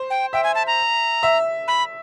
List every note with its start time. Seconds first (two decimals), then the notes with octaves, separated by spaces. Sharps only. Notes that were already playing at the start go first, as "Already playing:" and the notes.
Already playing: C5
0.10 G5
0.33 E5 G5
0.44 G#5
0.55 A5
0.67 A#5
1.23 E5
1.68 B5